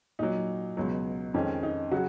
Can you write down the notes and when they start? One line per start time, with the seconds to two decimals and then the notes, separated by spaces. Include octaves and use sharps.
0.19 A#2 F#3 D#4
0.77 C#2 B2 F#3
1.34 F2 D#3 G#3 C#4
1.63 D#4
1.91 C#3 F#3 F#4